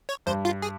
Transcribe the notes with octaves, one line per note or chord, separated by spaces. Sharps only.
C#5
G2 C5
F4
G#4